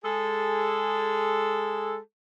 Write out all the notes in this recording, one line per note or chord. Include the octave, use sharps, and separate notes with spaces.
G#3 G#4 A4